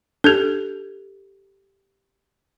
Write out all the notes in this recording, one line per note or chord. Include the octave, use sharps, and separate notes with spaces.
D4 G4 A4 G6 G#6